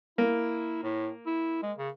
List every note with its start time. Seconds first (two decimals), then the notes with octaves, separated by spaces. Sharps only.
0.18 A#3 E4
0.83 A2
1.26 E4
1.63 G#3
1.78 C#3